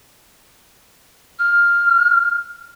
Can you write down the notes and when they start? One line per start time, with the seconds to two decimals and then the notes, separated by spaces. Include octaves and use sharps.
1.39 F6